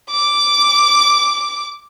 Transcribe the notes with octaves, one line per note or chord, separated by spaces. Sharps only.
D6